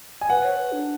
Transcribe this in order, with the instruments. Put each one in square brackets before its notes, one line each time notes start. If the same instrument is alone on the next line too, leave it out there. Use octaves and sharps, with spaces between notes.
[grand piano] G#5
[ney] B4 [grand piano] F#5
[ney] C#5
B4
D4